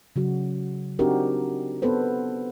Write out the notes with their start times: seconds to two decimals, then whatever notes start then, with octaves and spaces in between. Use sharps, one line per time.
0.16 C#3 F#3 F#4
0.99 C4 D4 D#4 F#4 G4 A#4
1.82 B3 C4 A4 B4 C5